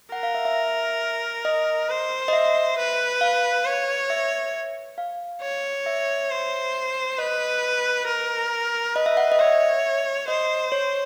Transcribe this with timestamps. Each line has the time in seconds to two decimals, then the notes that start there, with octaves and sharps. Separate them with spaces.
0.12 A#4 F#5
0.23 F5
0.35 E5
0.45 E5
1.45 D#5
1.89 C5
2.28 D#5
2.33 E5
2.78 B4
3.21 F5
3.65 C#5
4.10 E5
4.98 F5
5.42 C#5
5.86 E5
6.31 C5
7.18 B4 D#5
8.07 A#4
8.95 B4 D#5
9.06 E5
9.17 F#5
9.32 D#5
9.39 C#5 E5
10.28 C5 D#5
10.72 C#5